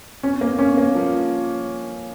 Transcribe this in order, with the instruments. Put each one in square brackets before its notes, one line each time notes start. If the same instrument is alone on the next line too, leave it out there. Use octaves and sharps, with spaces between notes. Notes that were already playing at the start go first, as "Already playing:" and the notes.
[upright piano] C#4
A#3
C#4
A#3
F3